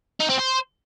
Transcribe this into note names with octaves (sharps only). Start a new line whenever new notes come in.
D#4
C4
C5